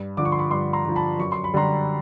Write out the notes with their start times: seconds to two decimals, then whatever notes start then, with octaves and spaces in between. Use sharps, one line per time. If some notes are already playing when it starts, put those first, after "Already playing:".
Already playing: G2
0.17 D3 F3 D6
0.25 C#6
0.32 C6
0.39 B5 C#6
0.51 G2 C6 D6
0.73 A#5 C6
0.85 D3 F3
0.96 A5 B5
1.19 F#2 C#6
1.32 C6
1.44 B5
1.54 D3 G3 A#5 C6